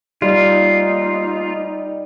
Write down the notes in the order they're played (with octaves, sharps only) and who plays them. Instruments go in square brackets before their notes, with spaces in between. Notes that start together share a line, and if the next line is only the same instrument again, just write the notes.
[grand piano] G3 [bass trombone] D#4 [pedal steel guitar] F4